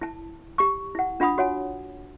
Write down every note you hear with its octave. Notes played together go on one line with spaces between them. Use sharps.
E4 A5
G4 C#6
E4 F#5
D4 F4 F#5 B5 D#6
F#4 C#5 F#5 G#5